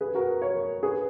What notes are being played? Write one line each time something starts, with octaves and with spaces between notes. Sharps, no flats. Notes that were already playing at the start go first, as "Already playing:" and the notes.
G#4 B4
F#4 A#4
A#4 C#5
G#4 B4